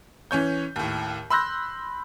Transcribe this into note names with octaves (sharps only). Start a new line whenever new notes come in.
E3 C#4 C#5 G6
D#2 A2
B5 C6 E6 F#6 G6 A#6